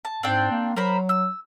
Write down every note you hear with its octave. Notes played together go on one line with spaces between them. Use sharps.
A5
G#2 C4 D4 G5
A#3
F#3 A#4 C5 B5
E6